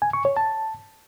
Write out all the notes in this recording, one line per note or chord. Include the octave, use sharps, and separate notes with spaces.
G#5
C#6
C#5
A5